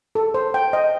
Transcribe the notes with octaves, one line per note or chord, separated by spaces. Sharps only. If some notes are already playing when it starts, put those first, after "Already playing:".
A4
C5
G5
D#5